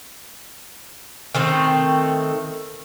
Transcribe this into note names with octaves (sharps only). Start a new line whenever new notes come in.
D#3 A3 C4